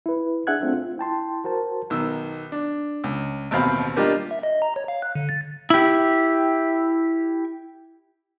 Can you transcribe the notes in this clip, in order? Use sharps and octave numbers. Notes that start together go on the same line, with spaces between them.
E4 B4
D4 G#4 E5 F#5 F#6 G#6
A3 C4 D4 F4 A4 E5
F4
E4 G5 A5 C6
F#4 A#4 C5 A5
B1 D#3 E6
D4
C#2
A1 D#2 B2 C4 F5 B5
G3 A#3 D4 F4 G4 D#5
E5
D#5
A#5
C#5
F5
F#6
D3
A6
E4 G4